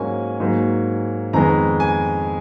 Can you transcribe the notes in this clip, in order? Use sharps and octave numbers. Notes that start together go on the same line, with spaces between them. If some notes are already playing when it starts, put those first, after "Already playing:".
Already playing: G#2 F#3 A#3 C#4 G#5
G#2 F#3 A#3
F2 D#3 G#3 B3 A#5
G#5